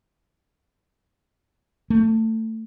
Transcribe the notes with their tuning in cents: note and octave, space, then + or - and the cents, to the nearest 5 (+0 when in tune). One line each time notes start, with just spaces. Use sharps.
A3 +20